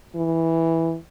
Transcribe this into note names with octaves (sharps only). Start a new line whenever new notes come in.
E3